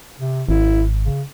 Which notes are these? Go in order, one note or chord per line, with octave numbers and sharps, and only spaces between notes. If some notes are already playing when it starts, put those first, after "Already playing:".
C3
G#1 E4
C#3